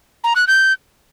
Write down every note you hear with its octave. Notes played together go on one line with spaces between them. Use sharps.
A#5
F#6
G6